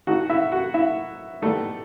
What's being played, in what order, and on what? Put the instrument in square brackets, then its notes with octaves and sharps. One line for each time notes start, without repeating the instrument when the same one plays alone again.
[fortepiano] A2 E3 A3 D#4 F#4 F#5
E4 E5
F#4 F#5
E4 E5
A2 E3 G3 A3 B3 D#4 A4